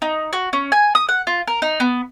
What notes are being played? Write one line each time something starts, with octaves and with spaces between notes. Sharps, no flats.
D#4
F#4
C#4
G#5
D#6
F#5
F4
A#4
D#4
B3